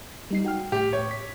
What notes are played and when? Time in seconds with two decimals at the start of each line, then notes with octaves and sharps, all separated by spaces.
0.31 G3 D#4 C7
0.45 F#4 G5 F6
0.72 A2 G4
0.93 C#5
1.11 B6